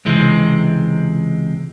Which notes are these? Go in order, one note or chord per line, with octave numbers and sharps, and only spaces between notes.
C#2 C3 E3 G#3 C4